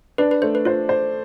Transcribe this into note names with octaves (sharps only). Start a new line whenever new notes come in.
D4 B4
B4
A3 C5
B4
F4 C5
C5